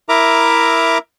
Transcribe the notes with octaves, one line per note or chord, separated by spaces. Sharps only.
E4 A#4 E5 A#5 D6